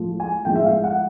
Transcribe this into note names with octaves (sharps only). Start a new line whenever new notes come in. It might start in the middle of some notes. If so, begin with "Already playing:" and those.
Already playing: A2 F3 G#3
G#5
A2 F3 G#3 G5
E5
F5
F#5